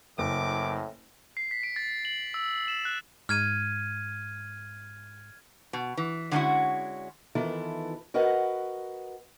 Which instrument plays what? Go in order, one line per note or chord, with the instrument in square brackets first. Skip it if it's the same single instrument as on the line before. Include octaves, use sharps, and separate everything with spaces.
[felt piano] F#1 [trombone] A2 [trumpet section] D6
[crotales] C7
B6
D7
A6
F#7
E6
E7
F#6
[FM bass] G#2 [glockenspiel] F6 G#6 D#7
[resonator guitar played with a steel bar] B2
E3
D3 G#3 A3 C#4 E4 F#4
[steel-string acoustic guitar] D#3 E3 B3 E4 F4 A4
F#4 A#4 B4 D#5 F#5